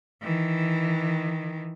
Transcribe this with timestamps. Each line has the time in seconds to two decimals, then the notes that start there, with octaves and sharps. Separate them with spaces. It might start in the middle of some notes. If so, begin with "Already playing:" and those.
0.22 D#3 E3